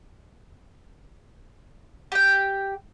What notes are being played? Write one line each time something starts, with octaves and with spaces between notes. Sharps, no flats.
G4 G5